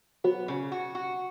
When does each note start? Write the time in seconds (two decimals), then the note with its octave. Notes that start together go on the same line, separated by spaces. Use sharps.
0.24 F#3 B3
0.48 C#3
0.72 F#4
0.95 F#4